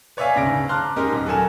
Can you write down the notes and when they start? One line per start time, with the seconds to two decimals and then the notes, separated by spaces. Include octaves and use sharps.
0.17 B4 C#5 D5 E5 F5 G#5
0.35 D2 G#2 C#3 A#6 D7
0.69 A5 A#5 C6 D6 F6 F#6
0.96 G#3 C#4 D#4 G4 A#4
1.13 D#1 A#5
1.26 F#3 A4 A#4 G#5 E7